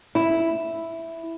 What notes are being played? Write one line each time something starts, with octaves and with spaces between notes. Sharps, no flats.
E4